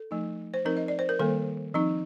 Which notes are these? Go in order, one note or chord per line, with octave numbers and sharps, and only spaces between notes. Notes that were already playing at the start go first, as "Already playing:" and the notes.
Already playing: A4
F3 A3 D#4
C5
F3 C4 D#4 A#4
D#5
D5
C5
A#4
D#3 G3 A#3 A4
F3 C4 D#4